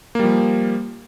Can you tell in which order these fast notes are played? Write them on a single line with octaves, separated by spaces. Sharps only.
A#3 G3 F3